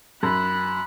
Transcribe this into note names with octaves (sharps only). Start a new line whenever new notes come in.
F#2 B5 F#6